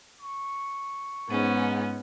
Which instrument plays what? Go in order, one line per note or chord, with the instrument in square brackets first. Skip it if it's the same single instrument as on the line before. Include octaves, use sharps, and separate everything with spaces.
[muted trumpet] C#6
[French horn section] G#2 [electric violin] B3 [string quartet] C#4